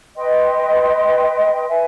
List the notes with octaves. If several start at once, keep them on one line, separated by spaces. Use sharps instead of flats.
B4 D#5 G5 C6
B4 E5 G#5